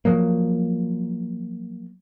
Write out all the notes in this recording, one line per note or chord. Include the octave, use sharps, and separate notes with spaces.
F3 F#3 A#3